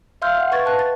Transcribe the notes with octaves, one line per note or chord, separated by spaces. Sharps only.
E5 F5 C6 E6 F6 G6
E5 F#5
B4 C#6 G#6 A6
B4 A5 F#6
A6